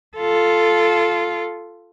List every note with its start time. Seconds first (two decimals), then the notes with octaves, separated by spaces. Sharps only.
0.17 F4 A4